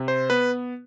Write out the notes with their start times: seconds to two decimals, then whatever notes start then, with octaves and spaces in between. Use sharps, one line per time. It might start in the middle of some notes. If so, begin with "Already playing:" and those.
Already playing: C3
0.08 C5
0.30 B3 B4